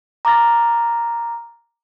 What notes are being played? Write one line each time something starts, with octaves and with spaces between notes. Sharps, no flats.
A#5 D6 F6 A6 A#6